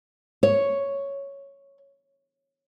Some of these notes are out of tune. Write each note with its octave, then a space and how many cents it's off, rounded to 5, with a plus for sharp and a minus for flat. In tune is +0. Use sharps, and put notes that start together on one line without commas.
C#5 +0